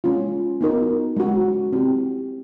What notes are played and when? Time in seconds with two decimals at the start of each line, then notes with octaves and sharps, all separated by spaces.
0.04 G#3 C#4 F4
0.61 B3 D#4 F#4 A#4
1.17 G#3 C#4 F#4
1.73 C4 E4 G4